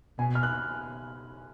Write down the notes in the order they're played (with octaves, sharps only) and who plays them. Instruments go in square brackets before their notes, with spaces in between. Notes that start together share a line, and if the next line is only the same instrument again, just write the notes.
[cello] B2 [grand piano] G#5
[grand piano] F6
F#6